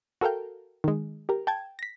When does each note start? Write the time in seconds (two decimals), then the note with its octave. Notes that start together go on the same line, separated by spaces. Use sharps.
0.21 F#4 A4 A#4 F5 G5
0.84 D#3 G#3
1.29 G4 A#4
1.47 G5 A5 G#6
1.79 A#6 B6